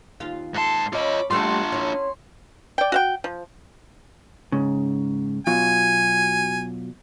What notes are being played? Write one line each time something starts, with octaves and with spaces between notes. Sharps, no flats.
D#2 F4 F5
G#2 A4 A5 C6
C#4 F4 D#5 B5 D6
G3 A3 D4 F4 F#4 E5 A5 C6
C#4 E4
D5 G5
F#4 F5 G5
F3
G#2 C#3
B2 F#3 F4 G#5